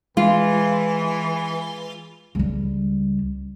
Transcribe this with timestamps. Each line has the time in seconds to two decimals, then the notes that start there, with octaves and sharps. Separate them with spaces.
0.17 E3 G#3 F4
2.35 C#2 G3